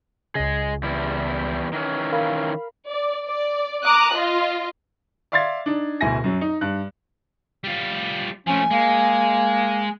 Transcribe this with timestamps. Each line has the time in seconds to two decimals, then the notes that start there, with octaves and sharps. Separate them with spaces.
0.35 C#2 C#3 G#4 D#5
0.83 E2 G3 E4
1.73 D#3 E3 C#4
2.12 A#4 F5 B5
2.89 D5
3.28 D5
3.84 A#5 D6 D#6 F#6
4.13 F4 D#5
5.32 D5 E5 F5 C6 G#6 A6
5.66 D4 D#4
6.01 D1 D2 B2 E4 G#5 A#6
6.24 F#2 F#3
6.41 D#4
6.61 G2 F#6
7.64 G3 F4
8.47 F3 A3 C#4 G#5
8.70 G#3 A#3